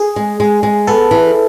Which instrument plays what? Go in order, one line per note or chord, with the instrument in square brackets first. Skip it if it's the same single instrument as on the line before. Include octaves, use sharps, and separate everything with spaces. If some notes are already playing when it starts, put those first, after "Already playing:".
Already playing: [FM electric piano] G#4
[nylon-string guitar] G#3
G#3
G#3
[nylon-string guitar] B3 [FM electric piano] A4
[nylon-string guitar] E3